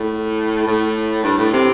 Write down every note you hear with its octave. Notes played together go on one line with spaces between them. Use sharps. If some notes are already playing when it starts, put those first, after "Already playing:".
Already playing: A2
A2
G2
A2
C3